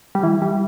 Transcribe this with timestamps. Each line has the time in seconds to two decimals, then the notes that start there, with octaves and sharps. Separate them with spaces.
0.15 G3
0.23 E3 E4
0.42 G3